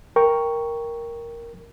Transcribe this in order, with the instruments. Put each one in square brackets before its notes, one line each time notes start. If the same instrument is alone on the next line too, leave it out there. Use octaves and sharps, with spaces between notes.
[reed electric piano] A#4 G5 C#6